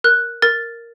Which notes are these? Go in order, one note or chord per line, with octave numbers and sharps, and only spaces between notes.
A#4 F#6
A#4 A6